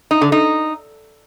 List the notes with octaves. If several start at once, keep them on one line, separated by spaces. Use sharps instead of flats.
D#4
D3
D#4